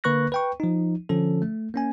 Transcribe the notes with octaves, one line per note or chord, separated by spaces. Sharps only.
D3 A#3 B4 C#6 F#6 A#6
B4 G5 C#6
F3 D#4
D3 F3 C#4 A4
A3
A#3 C#4 G#5